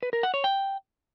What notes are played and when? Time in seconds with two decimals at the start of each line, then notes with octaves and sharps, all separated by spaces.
0.03 B4
0.13 A#4
0.23 F#5
0.34 C#5
0.44 G5